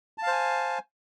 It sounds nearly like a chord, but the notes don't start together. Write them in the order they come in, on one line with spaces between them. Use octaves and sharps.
A5 F5 C5 G#5